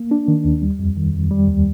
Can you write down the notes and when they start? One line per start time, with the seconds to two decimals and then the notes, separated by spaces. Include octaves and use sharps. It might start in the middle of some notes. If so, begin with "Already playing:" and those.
Already playing: A#3
0.11 D4
0.28 D#3
0.45 D#2
0.62 G3
0.79 F2
0.97 D#3
1.14 F2
1.31 G3
1.48 D#2